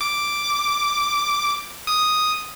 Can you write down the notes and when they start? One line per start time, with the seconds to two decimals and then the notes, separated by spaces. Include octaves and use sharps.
0.01 D6
1.87 D#6